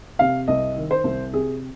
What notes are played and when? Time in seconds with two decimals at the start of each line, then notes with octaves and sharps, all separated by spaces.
0.19 C3 F5
0.48 C2 D#5
0.76 D#3
0.91 C5
1.04 C2
1.34 C3 G#4